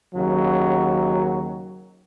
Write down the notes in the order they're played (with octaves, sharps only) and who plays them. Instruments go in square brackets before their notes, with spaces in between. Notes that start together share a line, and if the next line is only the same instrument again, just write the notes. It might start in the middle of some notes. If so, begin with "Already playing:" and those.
[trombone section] D#2 C#3 F#3